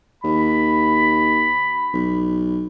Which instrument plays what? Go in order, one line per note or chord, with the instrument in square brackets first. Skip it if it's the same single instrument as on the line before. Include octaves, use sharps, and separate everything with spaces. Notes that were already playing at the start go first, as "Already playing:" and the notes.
[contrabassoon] D#2 [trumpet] B5
[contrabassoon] B1